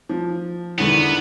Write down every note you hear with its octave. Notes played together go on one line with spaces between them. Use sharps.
F3
E2 D3 D#3 B3